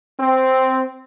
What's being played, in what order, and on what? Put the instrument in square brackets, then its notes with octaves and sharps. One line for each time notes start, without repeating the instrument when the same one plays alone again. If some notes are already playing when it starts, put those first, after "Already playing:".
[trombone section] C4